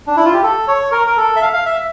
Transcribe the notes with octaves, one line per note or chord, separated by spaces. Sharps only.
D4
E4
F4
G4
A4
C#5
A#4
A#4
A4
E5
F5
F5
E5